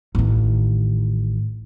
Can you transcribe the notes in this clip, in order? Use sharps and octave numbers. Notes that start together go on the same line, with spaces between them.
A1 D#3